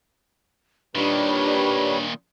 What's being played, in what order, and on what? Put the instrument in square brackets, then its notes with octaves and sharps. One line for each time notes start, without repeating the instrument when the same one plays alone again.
[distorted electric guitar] A#2 D#3 [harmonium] G3 B4 C#5 [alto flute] D4